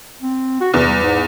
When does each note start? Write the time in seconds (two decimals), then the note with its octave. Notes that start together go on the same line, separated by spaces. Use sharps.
0.22 C4
0.61 F#4
0.74 E2 C3
0.87 G3
1.03 G#2